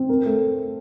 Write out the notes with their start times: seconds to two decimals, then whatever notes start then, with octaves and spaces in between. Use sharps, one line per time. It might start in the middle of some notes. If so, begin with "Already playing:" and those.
Already playing: C4
0.09 A#4
0.25 A3